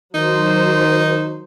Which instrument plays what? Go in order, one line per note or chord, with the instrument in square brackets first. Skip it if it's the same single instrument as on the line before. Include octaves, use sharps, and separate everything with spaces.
[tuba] D#3 [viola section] F#3 C5 [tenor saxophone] D#4